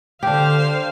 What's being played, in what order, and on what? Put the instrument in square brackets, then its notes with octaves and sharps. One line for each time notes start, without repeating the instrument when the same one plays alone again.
[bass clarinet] D3 [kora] D4 G4 [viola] C5 F5